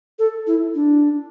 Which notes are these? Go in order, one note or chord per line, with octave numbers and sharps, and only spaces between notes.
A4
E4
D4